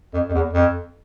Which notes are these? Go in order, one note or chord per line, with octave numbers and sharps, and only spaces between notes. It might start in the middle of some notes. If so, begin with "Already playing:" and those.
F2
F2
E2
F2